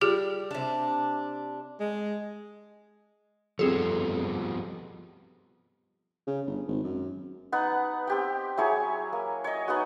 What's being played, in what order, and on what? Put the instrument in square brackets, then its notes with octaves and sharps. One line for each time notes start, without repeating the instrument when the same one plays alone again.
[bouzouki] G3 [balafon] F4 G4 G#4
[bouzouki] C3 D4
[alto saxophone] G#3
[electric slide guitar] F3 G3 B3 [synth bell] C4 G#4 A4
[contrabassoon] C#3
G1
G#1
F#2
[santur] B3 D#4 F#5
C4 G4 G5
F#3 E4 G#4 C#5
A#3
C#5 D#5
B3 D#4 F#4